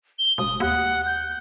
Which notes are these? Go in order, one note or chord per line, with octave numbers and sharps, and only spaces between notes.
G7
E1 D#6
D#2 F#5
G6